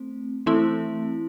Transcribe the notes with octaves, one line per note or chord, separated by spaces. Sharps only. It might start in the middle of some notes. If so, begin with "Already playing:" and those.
Already playing: A3 C4
E3 A3 C4 E4